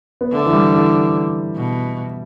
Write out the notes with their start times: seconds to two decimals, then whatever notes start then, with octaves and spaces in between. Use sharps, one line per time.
0.21 B3
0.32 D3 A3
0.46 E3
0.53 G3
0.74 E3
1.56 B2